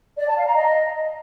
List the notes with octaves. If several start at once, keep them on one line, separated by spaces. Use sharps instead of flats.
D5
A5
F5
A#5
D#5